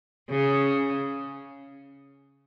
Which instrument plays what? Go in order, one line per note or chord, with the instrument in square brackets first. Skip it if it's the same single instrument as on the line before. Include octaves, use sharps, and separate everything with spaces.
[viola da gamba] C#3